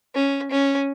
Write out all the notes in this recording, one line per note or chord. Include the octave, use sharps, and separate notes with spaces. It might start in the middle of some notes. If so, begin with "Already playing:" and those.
C#4
C#4